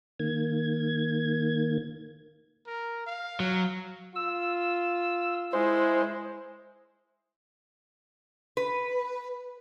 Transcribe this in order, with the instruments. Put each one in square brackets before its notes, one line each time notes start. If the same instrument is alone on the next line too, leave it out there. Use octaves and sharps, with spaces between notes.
[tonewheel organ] D#3 A#3 G#6
[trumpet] A#4
F5
[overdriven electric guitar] F#3
[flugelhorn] F4 [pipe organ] E6
[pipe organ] G#3 [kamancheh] E4 G#4 [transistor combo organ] C5
[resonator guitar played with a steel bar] B4